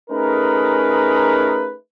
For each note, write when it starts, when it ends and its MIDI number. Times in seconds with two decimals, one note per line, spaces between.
0.11 1.73 57
0.11 1.73 61
0.11 1.73 63
0.11 1.73 68
0.11 1.73 70
0.11 1.73 71